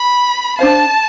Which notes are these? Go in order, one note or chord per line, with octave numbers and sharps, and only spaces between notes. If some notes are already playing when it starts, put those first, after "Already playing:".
Already playing: B5
D4 F4 C5 F5 A5